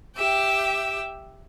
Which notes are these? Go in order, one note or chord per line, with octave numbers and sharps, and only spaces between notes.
G4 E5 G5